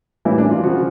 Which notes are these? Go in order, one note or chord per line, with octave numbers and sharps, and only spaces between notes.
A2 E3 G3 A#3 C#4 E4
D4
F4
C#3 F3 F#4